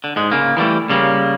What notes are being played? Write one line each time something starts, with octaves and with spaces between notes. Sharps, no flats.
D3
G#2 G#3
C#3 A#3
E3 F3 G3 A3
C#3 G3 A#3